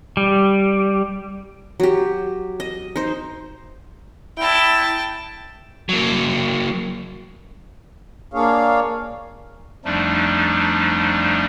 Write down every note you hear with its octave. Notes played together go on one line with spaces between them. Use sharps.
G3
F#3 G4
D#5
D#4 C5
E4 G5 A5
F#3 A#3
A#3 D4 G#4 C#5 F5
F2 F3 G3 A3 D4 D#4